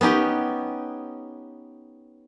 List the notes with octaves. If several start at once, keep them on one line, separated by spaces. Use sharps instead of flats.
B3 C#4 D#4 G4